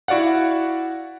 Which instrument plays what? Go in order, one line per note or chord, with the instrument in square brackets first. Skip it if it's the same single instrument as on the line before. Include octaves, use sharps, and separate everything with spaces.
[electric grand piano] E4 F#4 D5 F5 F#5